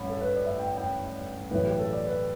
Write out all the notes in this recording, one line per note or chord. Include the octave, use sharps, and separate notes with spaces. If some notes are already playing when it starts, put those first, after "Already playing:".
Already playing: A1 G2 B5
A4
B4
D5
E5
G5
G5
B1 A2 E3 B4
G4
A4
D5
B4